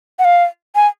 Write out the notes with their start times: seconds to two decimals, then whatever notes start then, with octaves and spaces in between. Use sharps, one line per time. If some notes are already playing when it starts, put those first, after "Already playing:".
0.19 F#5
0.25 F5
0.75 G#5